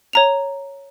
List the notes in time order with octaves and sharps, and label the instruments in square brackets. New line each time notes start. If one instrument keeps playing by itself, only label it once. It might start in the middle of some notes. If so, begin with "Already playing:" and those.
[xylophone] C#5 A#5 F7